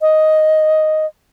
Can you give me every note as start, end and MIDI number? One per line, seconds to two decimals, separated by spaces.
0.01 1.06 75